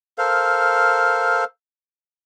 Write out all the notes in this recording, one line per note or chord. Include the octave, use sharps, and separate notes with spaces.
A4 A#4 C5 F5